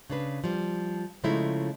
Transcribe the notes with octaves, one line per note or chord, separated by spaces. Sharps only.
C#3 D4 B4
F3 G3
C#3 F3 G#3 A3 D#4 E4